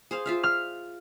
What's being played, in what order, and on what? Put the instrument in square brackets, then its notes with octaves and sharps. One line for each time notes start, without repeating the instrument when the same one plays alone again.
[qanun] G#4 C5 F5
F4 E5 F5
[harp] F6